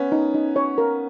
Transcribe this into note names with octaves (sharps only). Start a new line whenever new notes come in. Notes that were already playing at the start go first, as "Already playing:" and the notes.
Already playing: B3 C#4
D#4
D#4
C#5
A#4